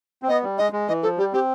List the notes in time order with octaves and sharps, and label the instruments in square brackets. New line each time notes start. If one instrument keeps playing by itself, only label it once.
[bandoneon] C4
[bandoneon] B3 [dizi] D#5
[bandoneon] G3
[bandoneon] G#3 [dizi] D#5
[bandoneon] G#3
[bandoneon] E3 [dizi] D#5
[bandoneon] F3 [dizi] A4
[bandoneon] G3 [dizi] G4
[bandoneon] C4 [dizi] G4